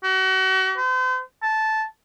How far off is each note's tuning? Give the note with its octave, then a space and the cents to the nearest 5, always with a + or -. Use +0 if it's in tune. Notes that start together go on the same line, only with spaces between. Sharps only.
F#4 +35
C5 -40
A5 -10